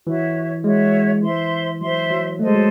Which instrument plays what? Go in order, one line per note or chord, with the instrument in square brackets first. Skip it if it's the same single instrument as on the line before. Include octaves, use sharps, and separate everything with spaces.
[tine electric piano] E3 [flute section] F#4 C#5 E5
[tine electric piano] G#3 [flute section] F#4 C#5 E5
[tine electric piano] E3 [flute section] C5 E5 C6
[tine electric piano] F#3 [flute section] C5 E5 C6
[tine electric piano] F#3
[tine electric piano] A3 [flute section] A4 C5 D#5
[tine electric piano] G#3
F#3